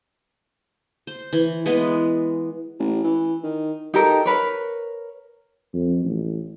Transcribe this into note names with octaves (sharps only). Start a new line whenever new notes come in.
C5
E3
E3 G#3 B3
A1
E3
D#3
D#4 G4 A4 A#4
A#4 B4 C#5
F2
A1